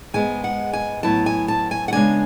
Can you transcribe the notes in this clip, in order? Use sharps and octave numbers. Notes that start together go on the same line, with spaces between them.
G#2 G#3 B3 G#5
F#5
G#5
A2 F#3 B3 E4 A5
G#5
A5
G#5
F#5
C#3 G#3 B3 D4 G#5